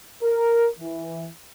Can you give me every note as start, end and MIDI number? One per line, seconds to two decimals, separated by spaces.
0.23 0.67 70
0.79 1.28 52